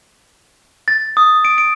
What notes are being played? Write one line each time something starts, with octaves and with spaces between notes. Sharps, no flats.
A6
D#6
D7
D7